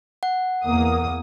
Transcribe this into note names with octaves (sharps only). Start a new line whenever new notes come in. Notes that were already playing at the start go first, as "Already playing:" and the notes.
F#5
E2 A#3 D#6